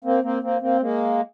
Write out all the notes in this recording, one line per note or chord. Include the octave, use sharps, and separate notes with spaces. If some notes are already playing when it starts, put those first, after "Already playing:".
A#3 C4
A#3 C4
A#3 C4
A#3 C4
G#3 A#3